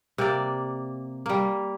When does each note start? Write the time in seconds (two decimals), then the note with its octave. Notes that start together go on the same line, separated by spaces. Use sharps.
0.18 C3 A#3 D5
1.26 G3 A#3